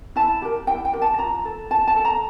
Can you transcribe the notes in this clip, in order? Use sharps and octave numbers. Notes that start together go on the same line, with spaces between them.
E4 A5
G4 A#4
E4 G5
G5
G4 A#4
A5
F4 A#5
A4
F4 A5
A5
A4
A#5